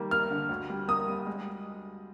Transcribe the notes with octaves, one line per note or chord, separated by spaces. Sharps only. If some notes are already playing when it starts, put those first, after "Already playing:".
Already playing: D#3 G3 A#3
A#3 F6
D3
D2
G3
A#3 D#6
G3
G#3